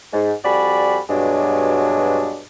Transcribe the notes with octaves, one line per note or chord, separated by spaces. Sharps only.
G#2
F2 G3 F#4 D5 G#5 B5
G2 B2 F#3 G#3 D4